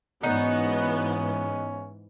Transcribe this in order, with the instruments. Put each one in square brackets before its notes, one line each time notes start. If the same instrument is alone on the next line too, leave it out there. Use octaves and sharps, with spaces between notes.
[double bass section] G#2 E3 [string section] B3 [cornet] C#4 [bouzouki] D#4 F#4